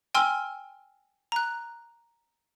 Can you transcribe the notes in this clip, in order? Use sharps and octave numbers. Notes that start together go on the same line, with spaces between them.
G5 G#5 C6 E6 F6
A#5 F#6